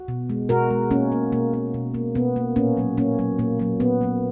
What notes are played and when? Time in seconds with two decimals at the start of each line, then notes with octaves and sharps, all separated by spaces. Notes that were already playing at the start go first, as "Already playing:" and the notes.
Already playing: F#4
0.08 B2
0.30 G#3
0.49 B2 F#4 A#4
0.71 G#3
0.91 B2 A#3 C#4
1.12 A#3
1.32 B2 A#3
1.53 A#3
1.74 B2
1.94 A#3
2.15 B2 B3
2.36 A#3
2.56 A#2 A#3 C#4
2.77 F#3 A#3
2.97 A#2 A#3 C#4
3.19 F#3 A#3
3.38 A#2 A#3
3.59 F#3 A#3
3.80 A#2 B3
4.01 F#3 A#3